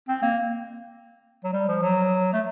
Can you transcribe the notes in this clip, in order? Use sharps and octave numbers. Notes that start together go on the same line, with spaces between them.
C4
A#3
F#3
G3
F3
F#3
A3